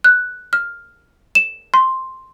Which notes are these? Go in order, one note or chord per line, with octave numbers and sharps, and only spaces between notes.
F#6
F6
E7
C6